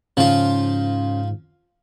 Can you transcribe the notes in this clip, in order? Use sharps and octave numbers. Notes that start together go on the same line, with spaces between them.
G#2 C#3 F3 F4